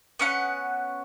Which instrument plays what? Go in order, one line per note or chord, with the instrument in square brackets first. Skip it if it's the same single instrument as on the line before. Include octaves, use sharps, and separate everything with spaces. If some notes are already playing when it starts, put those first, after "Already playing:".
[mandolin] B3 C#4 F#5